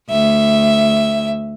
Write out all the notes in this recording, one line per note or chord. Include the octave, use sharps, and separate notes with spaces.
D2 E5